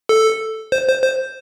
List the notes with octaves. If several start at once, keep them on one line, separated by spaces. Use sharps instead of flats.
A4
C5
C5
C5